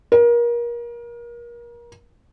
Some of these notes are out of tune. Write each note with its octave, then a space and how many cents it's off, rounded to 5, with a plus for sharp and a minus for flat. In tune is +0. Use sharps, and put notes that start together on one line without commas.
A#4 +30